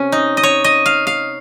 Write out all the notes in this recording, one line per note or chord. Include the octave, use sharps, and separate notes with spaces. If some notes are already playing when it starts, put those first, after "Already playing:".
Already playing: C3 C#4
D#4
D#5
C#5
D#5
F5
F5